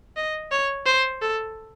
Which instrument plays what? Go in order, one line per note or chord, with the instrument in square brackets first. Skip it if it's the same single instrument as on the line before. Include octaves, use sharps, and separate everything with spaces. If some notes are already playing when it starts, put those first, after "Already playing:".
[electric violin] D#5
C#5
C5
A4